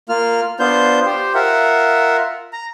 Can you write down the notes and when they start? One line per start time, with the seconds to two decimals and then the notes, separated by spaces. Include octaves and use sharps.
0.09 A#3 F4 F6
0.60 B3 D4 F4 C5 G6
1.06 G4 C5
1.35 F4 A#4 E5 F#5
2.53 A#5